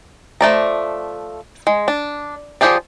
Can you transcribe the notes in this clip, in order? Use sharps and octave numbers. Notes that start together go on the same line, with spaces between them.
F3 A3 D5 A#5
G#3
D4
F3 A#3 G4 G#4 D5